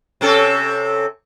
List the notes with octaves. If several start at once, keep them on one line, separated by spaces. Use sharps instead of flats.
C3 C#4 A4